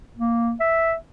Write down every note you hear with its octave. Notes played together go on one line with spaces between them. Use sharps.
A#3
E5